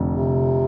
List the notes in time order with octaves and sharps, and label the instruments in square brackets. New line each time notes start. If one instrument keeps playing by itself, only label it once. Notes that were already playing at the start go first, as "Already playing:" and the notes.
Already playing: [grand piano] F1 F2 D3
[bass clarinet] C3